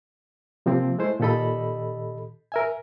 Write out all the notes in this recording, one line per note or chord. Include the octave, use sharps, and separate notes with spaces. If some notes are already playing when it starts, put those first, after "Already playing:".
C3 F3 A#3 C4
G#3 A3 E4 C5
A#2 D#3 G4 A4 D#5 B5
A#4 E5 G#5